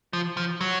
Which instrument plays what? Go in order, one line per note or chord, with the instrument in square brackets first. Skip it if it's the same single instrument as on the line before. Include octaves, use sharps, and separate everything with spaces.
[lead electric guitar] F3
F3
F#3